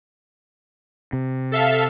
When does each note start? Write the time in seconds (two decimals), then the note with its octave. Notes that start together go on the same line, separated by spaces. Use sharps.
1.13 C3
1.52 A4 E5 F5